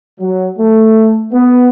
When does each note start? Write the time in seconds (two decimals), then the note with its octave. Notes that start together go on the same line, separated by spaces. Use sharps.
0.20 F#3
0.59 A3
1.33 B3